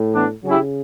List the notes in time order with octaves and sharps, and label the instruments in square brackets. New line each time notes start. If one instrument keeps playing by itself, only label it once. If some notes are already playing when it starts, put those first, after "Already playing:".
Already playing: [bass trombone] A2
[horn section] E3 B3 D4
[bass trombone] C#3 [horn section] F#3 C#4 E4 G4